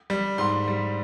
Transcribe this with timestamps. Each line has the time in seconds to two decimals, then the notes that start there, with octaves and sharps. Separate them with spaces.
0.10 G3
0.38 G#2 C6
0.68 G3